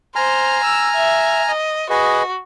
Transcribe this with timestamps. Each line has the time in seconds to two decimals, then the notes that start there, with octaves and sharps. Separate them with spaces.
0.16 C5 G#5 A#5 F6
0.64 E6
0.96 E5
1.49 D#5
1.90 F#4 G#4 B4 D#5